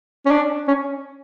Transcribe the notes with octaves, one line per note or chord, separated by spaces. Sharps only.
C#4
D4
C#4